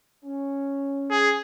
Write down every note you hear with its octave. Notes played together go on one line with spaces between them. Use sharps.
C#4
G#4